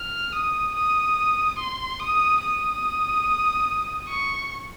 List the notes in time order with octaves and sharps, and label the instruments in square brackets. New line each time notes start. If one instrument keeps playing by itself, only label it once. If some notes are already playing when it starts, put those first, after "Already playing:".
Already playing: [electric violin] F6
D#6
D#6
C6
D#6
D#6
C#6